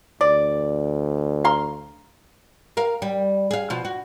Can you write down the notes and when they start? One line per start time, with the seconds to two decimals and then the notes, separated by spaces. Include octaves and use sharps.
0.21 D2 D5
1.45 F5 A#5 C6
2.77 A#4 F5
3.02 G3
3.51 G#4 F5
3.70 B2 F3
3.85 F#4